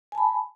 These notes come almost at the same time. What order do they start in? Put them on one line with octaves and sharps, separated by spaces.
G#5 A5 B5